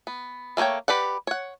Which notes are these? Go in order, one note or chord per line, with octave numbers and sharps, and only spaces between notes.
B3
A3 A#3 F4 C#5 G5
G4 B4 D5 F#5
C#5 F#5